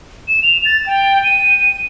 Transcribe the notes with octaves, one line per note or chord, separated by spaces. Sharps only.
E7
F7
A6
G5
D#7